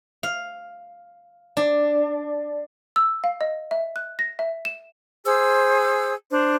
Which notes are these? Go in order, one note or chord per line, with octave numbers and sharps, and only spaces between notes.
F5
D4
E6
F5
D#5
E5
F#6
A#6
E5
E7
G#4 C5 E6
D4 C5